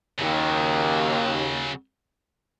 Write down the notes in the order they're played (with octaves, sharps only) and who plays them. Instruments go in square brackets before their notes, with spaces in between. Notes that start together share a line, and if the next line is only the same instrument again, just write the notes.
[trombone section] D#2 [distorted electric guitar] C#3 F#3